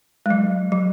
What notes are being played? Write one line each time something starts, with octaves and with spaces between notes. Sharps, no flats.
G#3
F#3
F#3